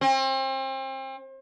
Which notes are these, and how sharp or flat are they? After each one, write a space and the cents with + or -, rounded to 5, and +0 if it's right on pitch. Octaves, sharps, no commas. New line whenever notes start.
C4 +35